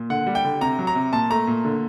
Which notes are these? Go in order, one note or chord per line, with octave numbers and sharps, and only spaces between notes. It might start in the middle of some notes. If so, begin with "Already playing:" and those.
Already playing: A#2
D3 F#5
G3
G5
D3
C3 A#5
F#3
A#5
C3
A#2 A5
A3 A#5
A#2
D3